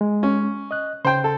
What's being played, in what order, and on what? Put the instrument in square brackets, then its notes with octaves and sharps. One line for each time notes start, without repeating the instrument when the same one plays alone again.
[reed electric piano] G#3
[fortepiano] C#4
[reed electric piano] D#5 F#6
[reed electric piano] C#3 [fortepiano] C5 G5
[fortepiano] A4